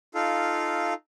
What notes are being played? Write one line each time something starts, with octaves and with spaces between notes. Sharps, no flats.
D#4 F4 A4 F5